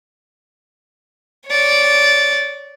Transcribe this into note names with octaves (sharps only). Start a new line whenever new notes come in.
C#5 D5